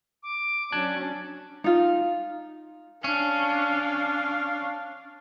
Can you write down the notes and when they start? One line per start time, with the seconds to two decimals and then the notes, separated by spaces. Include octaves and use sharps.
0.23 D6
0.72 F#3 C#4 D4 A5 F#6 G#6
1.64 D#4 F4
3.04 C#4 D4 F5